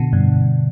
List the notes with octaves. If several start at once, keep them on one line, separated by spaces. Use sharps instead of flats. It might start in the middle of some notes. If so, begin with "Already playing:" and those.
Already playing: B2 D3
G2